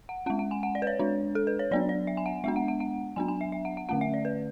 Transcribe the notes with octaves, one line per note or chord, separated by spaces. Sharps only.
F#5
G#3 C#4 F#5
F#5
G#5
F#5
D5
B4
C#5
G#3 D4
A4
B4
C#5
F#3 B3 D4 D5
D5
E5
G#5
F#5
G#3 B3 D4 E5
F#5
F#5
F#5
F#3 B3 D4 G#5
G#5
E5
E5
F#5
F#5
D3 A3 C#4 F#5
E5
D5
B4